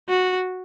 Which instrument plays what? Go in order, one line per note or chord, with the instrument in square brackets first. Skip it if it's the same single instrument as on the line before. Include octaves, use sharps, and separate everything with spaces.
[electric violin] F#4